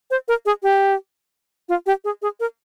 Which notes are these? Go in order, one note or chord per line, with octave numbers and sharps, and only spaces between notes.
C5
A#4
G#4
G4
F4
G4
G#4
G#4
A#4